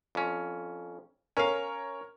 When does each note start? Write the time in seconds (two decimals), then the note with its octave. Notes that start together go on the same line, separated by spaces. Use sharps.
0.15 F2 C#4
1.37 C#4 A#4 C#5 F5